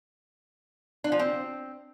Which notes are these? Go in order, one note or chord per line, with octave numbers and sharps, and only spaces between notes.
D4
F3
C4